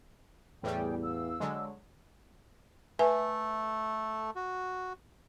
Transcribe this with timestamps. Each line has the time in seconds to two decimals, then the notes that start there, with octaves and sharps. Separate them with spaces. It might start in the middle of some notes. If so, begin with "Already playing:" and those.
0.64 E2 A2 E3 G3 G#4 G5
1.02 F5 E6
1.40 D3 F#3 G#3
2.99 A3 A4 B4 E5 G#5
4.35 F#4